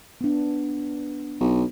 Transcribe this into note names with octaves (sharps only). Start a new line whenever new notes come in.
B3 D4
B1